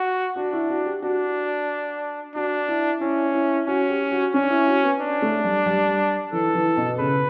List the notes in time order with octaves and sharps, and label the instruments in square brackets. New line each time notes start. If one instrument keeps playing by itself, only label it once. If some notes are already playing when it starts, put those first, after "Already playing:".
Already playing: [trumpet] F#4
[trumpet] D4 [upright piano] F#4
[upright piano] E4
F#4
G4
[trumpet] D4 [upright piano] F#4
[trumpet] D4 [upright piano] F#4
[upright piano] E4
[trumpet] C#4 [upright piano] E4
[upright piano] E4
[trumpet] C#4 [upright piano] F#4
[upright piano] G4
F#4
[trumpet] C#4 [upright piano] D4
[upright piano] E4
F#4
B3
[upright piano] C#4 [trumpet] D4
[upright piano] A3
G3
G3
[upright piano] E3 [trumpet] A4
[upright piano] E3
B2
[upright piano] C#3 [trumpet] B4